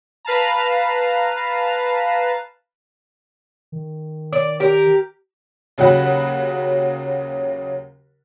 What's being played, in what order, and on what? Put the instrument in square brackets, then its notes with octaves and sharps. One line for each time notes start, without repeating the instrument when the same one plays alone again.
[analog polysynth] B4 F5 A5 A#5
[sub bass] D#3
[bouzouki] D5
G4 A#4
[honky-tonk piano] D#2 C#3 F#3 F#5 B5